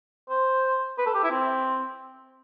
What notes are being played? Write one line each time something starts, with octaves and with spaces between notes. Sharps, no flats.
C5
B4
A4
G4
E4
C4